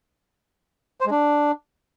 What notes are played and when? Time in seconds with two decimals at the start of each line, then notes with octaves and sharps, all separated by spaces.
1.01 C5
1.06 G#3
1.11 D4